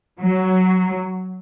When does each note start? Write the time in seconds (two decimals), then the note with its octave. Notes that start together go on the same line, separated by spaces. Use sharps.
0.21 F#3